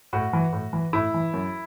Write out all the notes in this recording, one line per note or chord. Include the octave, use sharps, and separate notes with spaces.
A2 F#4
E3
A2
E3
A2 E4
E3
F#2